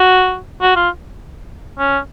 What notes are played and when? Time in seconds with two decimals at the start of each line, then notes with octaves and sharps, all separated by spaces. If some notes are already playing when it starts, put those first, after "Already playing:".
Already playing: F#4
0.62 F#4
0.76 F4
1.79 C#4